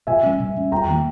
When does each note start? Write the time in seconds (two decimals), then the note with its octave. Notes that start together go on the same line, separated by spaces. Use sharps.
0.07 B2 E5 G#5
0.23 G3 C#4
0.40 B2
0.56 G3 C#4
0.72 E2 G5 A#5
0.87 D#3 G3 A#3